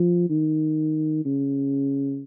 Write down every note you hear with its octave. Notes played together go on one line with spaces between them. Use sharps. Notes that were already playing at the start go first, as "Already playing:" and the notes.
Already playing: F3
D#3
C#3